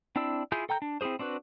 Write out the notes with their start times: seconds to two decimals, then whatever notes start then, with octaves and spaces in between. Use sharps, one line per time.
0.16 C4 D4 E4 D5 E6
0.52 E4 F4 G#4 G#5 G6
0.69 A4 G5 A#5 G6
0.82 D4
1.01 C4 E4 F#4 G#4 C5
1.19 C4 D4 F#4 B4